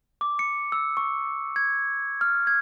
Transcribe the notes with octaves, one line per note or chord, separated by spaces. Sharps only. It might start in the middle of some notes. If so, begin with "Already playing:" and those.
D6
C#7
E6
C#6
G#6
F6
G#6